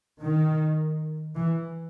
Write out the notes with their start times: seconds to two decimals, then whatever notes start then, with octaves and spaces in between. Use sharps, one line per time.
0.20 D#3
1.35 E3